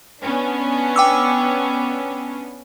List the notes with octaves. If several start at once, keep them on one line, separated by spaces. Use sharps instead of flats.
B3 C#4 D4
G5 D6 E6